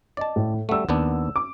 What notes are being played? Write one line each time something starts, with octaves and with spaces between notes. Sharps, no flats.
D5 D#5 A5
A2
G3 A3 F#5 E6
D#2 B3 D4
D6